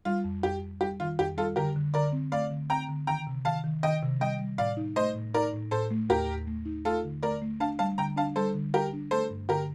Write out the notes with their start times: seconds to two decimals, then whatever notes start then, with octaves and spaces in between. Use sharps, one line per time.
0.05 G3 F4
0.24 F2
0.43 F2 G4
0.62 F2
0.80 G3 G4
1.00 D#3 F4
1.19 F2 G4
1.37 G3 F4 A4
1.56 D3 G4 A#4
1.76 D3
1.94 D3 A#4 D5
2.13 C4
2.32 A3 D5 F5
2.51 D3
2.70 C4 G5 A#5
2.89 D3
3.07 D#3 G5 A#5
3.27 C3
3.45 D#3 F5 A5
3.64 D#3
3.83 D#3 D#5 G5
4.02 C3
4.20 G3 D#5 G5
4.39 G3
4.58 A2 D5 F5
4.77 D#4
4.96 A3 C5 D#5
5.15 A2
5.34 D#4 A#4 D5
5.53 A2
5.71 A2 A4 C5
5.91 A3
6.09 D#2 G4 A#4
6.28 D#2
6.47 A3
6.65 D#4
6.85 A3 F4 A4
7.04 D3
7.23 A3 A#4 D5
7.42 A3
7.60 D4 F5 A5
7.79 G3 F5 A5
7.98 D3 G5 A#5
8.16 D4 F5 A5
8.36 G3 A4 C5
8.55 D3
8.74 G3 G4 A#4
8.93 D4
9.11 A3 A4 C5
9.30 G2
9.49 D3 G4 A#4